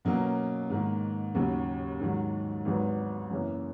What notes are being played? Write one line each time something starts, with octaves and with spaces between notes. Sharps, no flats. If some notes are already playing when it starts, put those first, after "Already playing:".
B2 F#3 A#3 C#4
G#2 D#3 A#3
D#2 C#3 F#3
G#2 D#3 F#3
G#1 G#2 F#3 B3
F#2 C#3 E3 A#3